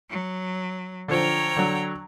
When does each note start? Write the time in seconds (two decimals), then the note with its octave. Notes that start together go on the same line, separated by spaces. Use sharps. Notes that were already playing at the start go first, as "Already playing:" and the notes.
0.10 F#3
1.08 D3 F3 C#5 G5 A#5
1.57 D3 F#3